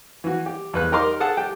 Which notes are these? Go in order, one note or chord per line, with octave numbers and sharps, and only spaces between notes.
E3 F#4
G4
E2 B4 F#6
D#4 G4 A#4 D#5 C6 D6
G#4 A4 F#5 A5
G4 G5